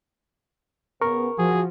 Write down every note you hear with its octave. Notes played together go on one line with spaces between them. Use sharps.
C#3 B3 A#4 C#6
F3 F#4 G#4